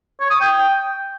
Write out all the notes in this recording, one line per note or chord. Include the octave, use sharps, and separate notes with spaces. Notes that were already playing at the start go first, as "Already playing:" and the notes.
C#5
D#6
G5